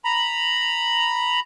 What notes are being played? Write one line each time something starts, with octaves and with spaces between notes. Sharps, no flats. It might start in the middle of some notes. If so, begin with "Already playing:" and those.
A#5 B5